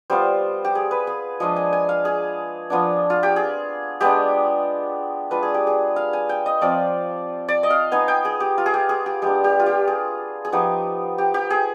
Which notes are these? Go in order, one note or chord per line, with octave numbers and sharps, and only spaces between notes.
G3 B3 F4 C5
G4
G#4
B4
G#4
F3 G#3 D4 F4 D#5
G#5
G#5
F5
G#4
F3 B3 D4
F4
G4
G#4
G#3 B3 D4 G4
G#3 D4 F4 B4
G#4
G4
G#4
F5
G#5
G5
D#5
F3 C4 F4 D5
D5
D#5
F5
B3 D#4 G#5
G5
G#4
G4
F4
G#4
G4
G#4
G4
G#3 B3 D4 G4
G4
F4
G4
G#4
G#4
F3 B3 D#4 G4
G4
G4
G#4